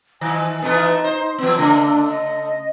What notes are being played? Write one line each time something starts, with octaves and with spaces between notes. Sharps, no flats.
D#3 G#5
E3 A3 B3 D#4
C5
E3 B3
C#3 A3 D4
D#5